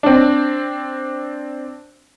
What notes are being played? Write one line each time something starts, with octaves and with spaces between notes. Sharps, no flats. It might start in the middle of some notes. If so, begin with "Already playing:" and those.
C4 D4